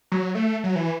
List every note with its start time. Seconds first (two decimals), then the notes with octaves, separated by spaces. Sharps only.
0.12 F#3
0.35 A3
0.64 F#3
0.76 E3